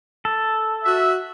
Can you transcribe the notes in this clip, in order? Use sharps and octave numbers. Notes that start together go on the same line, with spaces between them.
A4
F#4 E5